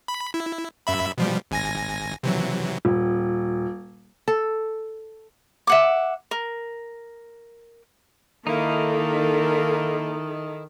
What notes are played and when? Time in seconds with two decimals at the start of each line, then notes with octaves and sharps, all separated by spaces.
0.08 B5
0.34 E4
0.87 F#2 E5 B5
1.18 B2 F3 G3
1.51 G#1 G#5 A#6
2.23 C3 E3 F#3
2.85 D#1
4.28 A4
5.67 E5 F#5 D6
6.31 A#4
8.47 D#3 A#3 D#4 E4 A4